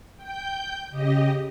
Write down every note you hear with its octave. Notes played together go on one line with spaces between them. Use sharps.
G5 G6
C#3 G4 D#5